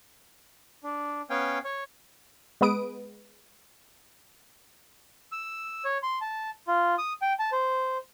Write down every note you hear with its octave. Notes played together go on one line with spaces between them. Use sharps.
D4
B3 C#4 F5 G5 G#5
C#5
G#3 B3 B4 D#6 D7
E6
C#5
C6
A5
F4
D#6
G5
A5
C5